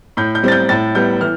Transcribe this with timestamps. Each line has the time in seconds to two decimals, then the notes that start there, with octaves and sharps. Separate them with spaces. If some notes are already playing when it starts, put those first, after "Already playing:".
0.17 A2 G6
0.35 G6
0.43 G3 C4 A6
0.52 G6
0.69 A2 A6
0.95 G3 B3 G6
1.21 E3 F6